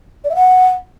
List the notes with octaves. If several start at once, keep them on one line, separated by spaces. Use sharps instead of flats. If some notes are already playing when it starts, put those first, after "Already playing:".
D5
E5
F#5